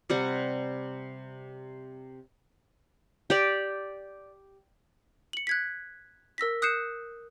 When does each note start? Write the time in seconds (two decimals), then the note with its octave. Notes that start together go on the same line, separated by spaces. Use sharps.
0.10 C3 G3 F#5
3.30 G4 D5
5.33 C#7 F#7
5.47 F#6 G#6 B6
6.38 A#4 E6 A#6 B6
6.62 D#6 F#6 G6 C7 C#7 E7